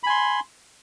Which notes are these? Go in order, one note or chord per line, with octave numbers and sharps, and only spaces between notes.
G#5 B5 C6